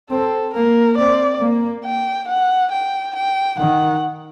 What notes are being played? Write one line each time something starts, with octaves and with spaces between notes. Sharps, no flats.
C4 A4
A#3 A#4
C4 D5
A#3
G5
F#5
G5
G5
D#3 F#5